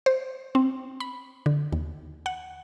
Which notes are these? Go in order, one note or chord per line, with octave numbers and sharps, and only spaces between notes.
C5
C4
B5
D3
D#2
F#5